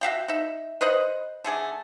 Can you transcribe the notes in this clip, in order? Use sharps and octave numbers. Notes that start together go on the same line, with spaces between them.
F#4 E5 F5 G5
D#4 E5
B4 C5 D#5 F#5
D3 A3 G#4 D5